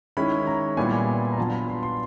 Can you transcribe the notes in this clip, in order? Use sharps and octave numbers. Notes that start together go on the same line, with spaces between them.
D#3 G#3 C#4 E4 B5
A#5
A#2 G3 B3 E4 G#5
A#5
F#3 B3 D4 F4 A5
B5
C6
C6